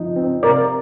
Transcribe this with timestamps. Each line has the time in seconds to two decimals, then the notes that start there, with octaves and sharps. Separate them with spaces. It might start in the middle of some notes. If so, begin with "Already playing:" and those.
Already playing: F3 D#4
0.16 C4
0.43 C3 A#4 D5